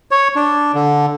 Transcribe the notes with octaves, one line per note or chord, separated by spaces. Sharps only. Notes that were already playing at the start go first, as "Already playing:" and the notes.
C#5
D4
D3